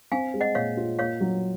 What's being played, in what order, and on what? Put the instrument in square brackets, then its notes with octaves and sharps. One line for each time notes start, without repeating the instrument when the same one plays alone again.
[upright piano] C4 [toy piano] F5 G#5
[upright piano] G#3
[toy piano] D#5 F#5
[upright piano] A#2 [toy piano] C#5 F5
[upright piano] F4
[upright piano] A#3 [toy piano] C#5 F5
[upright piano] F#3